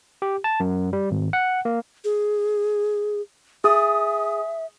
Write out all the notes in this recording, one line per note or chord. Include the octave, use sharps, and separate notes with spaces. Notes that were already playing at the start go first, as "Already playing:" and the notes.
G4
A5
F#2
G3
G#1
F#5
A#3
G#4
G#4 E5 D#6